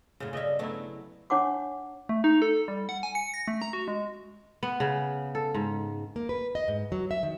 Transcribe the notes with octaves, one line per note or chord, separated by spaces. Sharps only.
F#2 A2 C#3
G2 C#3 G3 D#5 E5
F#3 A3 B3 D4 E4
D4 C#5 F#5 A5 C#6 D6
A3
D#4
A4
G3
F#5
G#5
C#7
A#6
A3
A#5
F#4
G#3
B3
C#3
A4
G#2
A#3
B4
D#5
G#2
F#3
E5
D#3